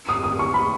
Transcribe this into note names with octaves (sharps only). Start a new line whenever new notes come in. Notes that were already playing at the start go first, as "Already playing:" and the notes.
D#6
D#6
C#6
B5